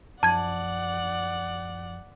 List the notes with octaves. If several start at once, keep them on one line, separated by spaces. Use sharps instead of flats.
F#2 F3 D5 F#5 A5 G#6